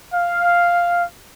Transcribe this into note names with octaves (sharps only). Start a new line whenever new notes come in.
F5